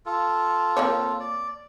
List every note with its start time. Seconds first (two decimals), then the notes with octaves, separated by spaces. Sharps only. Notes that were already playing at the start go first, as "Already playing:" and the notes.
0.06 F4 A4
0.77 A#3 C4 C#5
1.20 D5